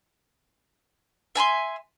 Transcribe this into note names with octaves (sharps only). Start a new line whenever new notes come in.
E5 G#5 B5 C6